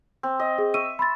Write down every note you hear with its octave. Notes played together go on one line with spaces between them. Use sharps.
C4
D#5
G#4
E5 C#6 E6 D#7
B5 C6 A6